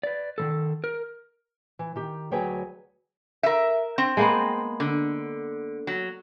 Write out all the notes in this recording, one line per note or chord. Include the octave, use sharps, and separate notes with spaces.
B4 D5
D#3 E3 A4
A#4
E3
D#3 G4
D2 F#3 G#4 B4 C#5 G5
A#4 E5
C4
G#3 A#3 B3
D3
F#3